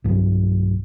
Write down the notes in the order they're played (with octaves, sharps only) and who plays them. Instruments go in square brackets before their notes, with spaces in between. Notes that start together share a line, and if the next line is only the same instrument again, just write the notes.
[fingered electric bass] B1 G2 F#3